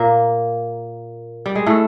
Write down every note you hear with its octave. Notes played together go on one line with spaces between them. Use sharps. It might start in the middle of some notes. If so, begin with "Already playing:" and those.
Already playing: A#2 A#3
G3
G#3
A2 A3